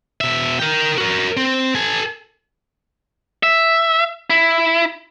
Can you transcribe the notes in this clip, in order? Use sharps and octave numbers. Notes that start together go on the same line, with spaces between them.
B2 E5
A#4 G5
F#4 A#4
C4
A4 G#5
E5
E4